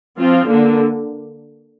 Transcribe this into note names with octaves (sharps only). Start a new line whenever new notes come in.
F3 C4 F4
D3 A#3 D4